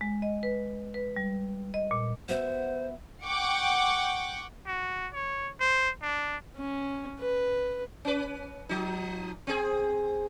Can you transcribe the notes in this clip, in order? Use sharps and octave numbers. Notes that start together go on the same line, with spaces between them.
G#3
D#5
B4
B4
G3
D#5
A#2
B3 F#4 C5 E5
F#5 G5 C#6 D6
F#4
C#5
C5
D4
C#4
B4
C#4 B4
F3 D#4
C4 G#4